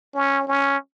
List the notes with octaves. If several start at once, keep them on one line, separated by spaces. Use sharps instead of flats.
C#4
C#4